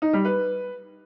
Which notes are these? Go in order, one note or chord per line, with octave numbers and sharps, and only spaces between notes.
D#4
G3
B4